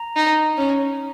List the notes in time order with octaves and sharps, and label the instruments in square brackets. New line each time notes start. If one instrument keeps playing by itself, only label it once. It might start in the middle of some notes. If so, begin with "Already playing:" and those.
Already playing: [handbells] A#5
[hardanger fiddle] D#4
C#4